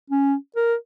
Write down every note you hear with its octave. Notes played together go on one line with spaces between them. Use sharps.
C#4
A#4